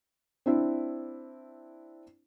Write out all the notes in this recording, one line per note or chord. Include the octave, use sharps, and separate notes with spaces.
C4 D4 E4